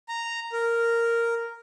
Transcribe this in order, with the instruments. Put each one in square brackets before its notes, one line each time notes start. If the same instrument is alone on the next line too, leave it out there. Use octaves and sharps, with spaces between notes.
[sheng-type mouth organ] A#5
A#4